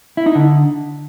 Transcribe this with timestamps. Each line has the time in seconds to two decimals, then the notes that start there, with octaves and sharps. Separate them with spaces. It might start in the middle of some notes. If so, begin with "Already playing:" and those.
0.17 E4
0.26 D#4
0.35 D3